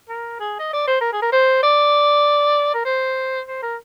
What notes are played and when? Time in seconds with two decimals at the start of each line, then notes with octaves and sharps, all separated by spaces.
0.09 A#4
0.39 G#4
0.59 D#5
0.73 D5
0.87 C5
1.01 A#4
1.13 G#4
1.22 A#4
1.32 C5
1.63 D5
2.74 A#4
2.85 C5
3.47 C5
3.62 A#4